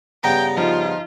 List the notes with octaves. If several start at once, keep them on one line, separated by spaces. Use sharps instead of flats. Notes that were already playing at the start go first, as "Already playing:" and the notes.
G2 C#3 B3 G5 A#5
F3 D#4 F4